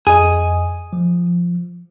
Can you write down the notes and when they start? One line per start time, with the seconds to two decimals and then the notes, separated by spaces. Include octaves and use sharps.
0.07 F2 G#4 D#5
0.93 F3